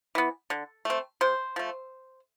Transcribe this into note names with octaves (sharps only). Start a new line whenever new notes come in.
E3 B3
D3
A3 C4
C3 C5
F3 A3